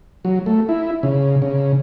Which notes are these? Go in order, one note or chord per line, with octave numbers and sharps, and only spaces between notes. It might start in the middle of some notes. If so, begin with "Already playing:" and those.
F#3
A3
E4
C#3
C#3